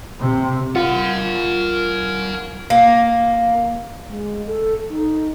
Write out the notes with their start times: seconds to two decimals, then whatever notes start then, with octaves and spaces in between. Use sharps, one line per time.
0.20 C3
0.76 F4 A#4 F#5
2.70 A#3
4.09 G#3
4.47 A4
4.90 D#4